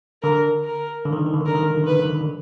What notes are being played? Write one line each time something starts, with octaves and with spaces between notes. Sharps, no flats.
D3 A#4
A#4
D3
D#3
D3
D#3
D3
D#3
D3 A#4
D#3
D3
D#3
D3
D#3
B4
D3
D#3
D3
D#3
D3